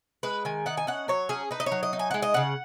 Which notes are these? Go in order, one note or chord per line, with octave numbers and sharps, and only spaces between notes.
G#3 B4
D#3 G#5
D#4 F#5
G#5
C#4 F#5
F#3 C#5
C#4 G#4
D#4 B4
D#5
C#5
F#3
D#5
D#4
G#5
G#3 F#5
D#5
C#3 F#5